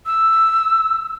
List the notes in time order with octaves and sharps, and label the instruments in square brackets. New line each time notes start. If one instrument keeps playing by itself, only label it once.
[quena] E6